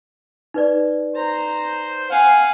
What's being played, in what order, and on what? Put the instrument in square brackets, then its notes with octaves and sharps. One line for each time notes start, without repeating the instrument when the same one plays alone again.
[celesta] D#4 B4 D5
[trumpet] C5 [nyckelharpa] A#5
[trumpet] F5 [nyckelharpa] F#5 G#5